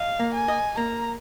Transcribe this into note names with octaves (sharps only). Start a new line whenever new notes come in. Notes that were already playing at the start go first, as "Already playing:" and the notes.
Already playing: D#5 F5
A#3
G#5
D#5
A#3 A#5